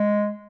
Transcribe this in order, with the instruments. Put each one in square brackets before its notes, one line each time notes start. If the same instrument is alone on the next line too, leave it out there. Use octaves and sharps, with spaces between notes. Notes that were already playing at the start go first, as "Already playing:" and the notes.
Already playing: [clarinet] G#3